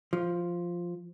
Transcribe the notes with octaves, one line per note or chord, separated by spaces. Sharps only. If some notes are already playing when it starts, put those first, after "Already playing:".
F3